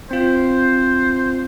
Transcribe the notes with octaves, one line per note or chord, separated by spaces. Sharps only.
C4 F4 C5